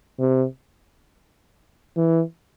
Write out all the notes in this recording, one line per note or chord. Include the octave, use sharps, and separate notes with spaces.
C3
E3